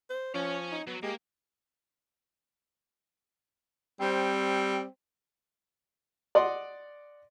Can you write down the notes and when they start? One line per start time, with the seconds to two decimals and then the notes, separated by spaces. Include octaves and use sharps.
0.10 C5
0.34 F3 C#4 C#5 G#5
0.72 D#4
0.87 F#3 B3
1.03 G#3 A#3 G4
4.00 G3 C4
6.35 D5 D#5 F#5 C6